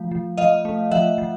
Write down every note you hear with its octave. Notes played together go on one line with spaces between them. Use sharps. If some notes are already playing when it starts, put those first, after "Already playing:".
Already playing: F3 A3
F3
F3 D#5 F5
A3
F3 E5 F#5
F3